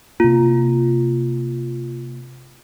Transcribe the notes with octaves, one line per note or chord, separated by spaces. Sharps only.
C3 A#3 F4